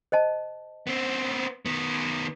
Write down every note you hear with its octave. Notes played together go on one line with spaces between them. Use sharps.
C5 D#5 A5
B3 C4
D#3 B3